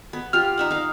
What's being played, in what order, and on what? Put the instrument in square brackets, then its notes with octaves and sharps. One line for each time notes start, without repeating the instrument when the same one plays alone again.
[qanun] B3
[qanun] F4 G4 [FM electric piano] F6
[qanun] D#4 E5 F#5
D#4 F5